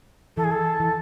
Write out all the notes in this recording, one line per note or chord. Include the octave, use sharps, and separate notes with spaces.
E3 A4
G#4
A4
E3